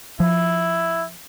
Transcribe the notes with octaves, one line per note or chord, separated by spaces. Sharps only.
F3 E4